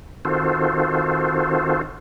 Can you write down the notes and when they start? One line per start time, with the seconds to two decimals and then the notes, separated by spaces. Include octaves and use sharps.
0.25 D#3 C4 F4 F#4 A4 C5